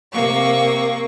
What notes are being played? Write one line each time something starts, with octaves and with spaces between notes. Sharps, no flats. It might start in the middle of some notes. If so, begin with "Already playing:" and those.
C3 A#3 C#6